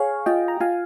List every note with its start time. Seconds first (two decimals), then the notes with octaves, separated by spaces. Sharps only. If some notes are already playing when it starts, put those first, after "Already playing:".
Already playing: G#4 C#5 F5
0.26 F4 D#5 G5
0.48 A#5
0.60 F4 F5 G#5